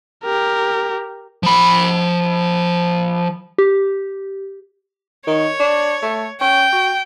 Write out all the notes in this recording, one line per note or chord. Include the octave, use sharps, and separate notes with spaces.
G4 A#4
F3 B5
G4
D#3 C#5
D4
A3
C#4 G5
F#4